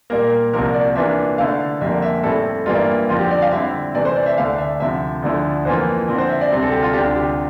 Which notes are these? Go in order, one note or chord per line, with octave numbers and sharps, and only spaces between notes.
A#2 G3 A#3 A#4
C2 C3 F3 A#3 A#4
D5
C3 E3 A#3 D4 F4 E5
D3 A3 E4 F5
F2 D3 G3 A#3 E5
E5
A2 G3 C4 E4 A4
A4
G2 E3 G3 A#3 E4 F4
F2 D3 F3 C4 F4
G4
D5
F5
D3 G3 C4 E4 E5
C3 E3 A3 D5
C5
D5
E5
D2 D3 A3 D4 F5
E5
D2 C3 F3 E5
D2 D3 F3 A3 E4
F2 E3 A#3 F4 C5
D3 F3 C4
C5
E5
D5
D2 C3 G3 C4
A4
G4
F4
D2 C3 G3 D4 F4 G4
G4